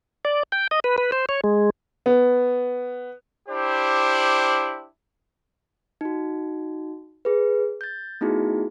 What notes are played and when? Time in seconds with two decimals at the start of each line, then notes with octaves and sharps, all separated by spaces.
0.25 D5
0.52 G5
0.71 D#5
0.84 B4
0.98 B4
1.12 C5
1.29 C#5
1.44 G#3
2.06 B3
3.49 D4 E4 G4 C5
6.01 D#4 F#4
7.25 G#4 B4
7.81 G6 A6
8.21 A3 B3 D#4 E4 F#4 G#4